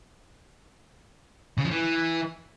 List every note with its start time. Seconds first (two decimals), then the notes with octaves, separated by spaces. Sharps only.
1.58 C#3
1.64 F3
1.71 E3